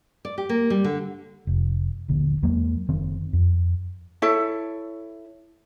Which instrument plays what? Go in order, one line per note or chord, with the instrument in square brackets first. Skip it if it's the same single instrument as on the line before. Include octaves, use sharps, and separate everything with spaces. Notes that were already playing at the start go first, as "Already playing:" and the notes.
[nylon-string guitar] D5
G4
A#3
G3
D3
[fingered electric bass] F1
D#1 A#1 D3
E2 F#3 G#3 A#3
F#1 D#3 C4
F2
[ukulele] E4 A4 C#5 E5